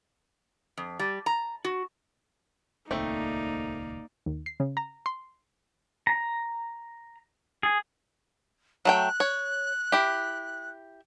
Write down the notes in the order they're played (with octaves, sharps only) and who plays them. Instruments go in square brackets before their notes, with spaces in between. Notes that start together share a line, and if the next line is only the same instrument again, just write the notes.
[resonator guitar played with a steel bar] F2
G3
A#5
F#4
[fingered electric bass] D#1 C#2 [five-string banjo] A3 C4 [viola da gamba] A#3 [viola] D#4 D5
[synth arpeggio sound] D#2
C7
C#3
A#5
C6
[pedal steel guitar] A#5
G#4
[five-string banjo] F#3 A3 G5 [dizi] F#6
[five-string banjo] C#5
E4 G4